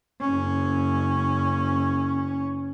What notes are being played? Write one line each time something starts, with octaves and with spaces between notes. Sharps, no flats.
F#1 C#4